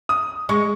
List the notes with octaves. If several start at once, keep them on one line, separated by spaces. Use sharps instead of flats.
D#6
G#3 C#6